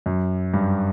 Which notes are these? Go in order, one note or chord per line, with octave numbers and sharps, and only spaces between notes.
F#2
G2